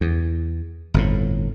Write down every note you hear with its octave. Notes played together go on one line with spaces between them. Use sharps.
E2
G1 F2 A2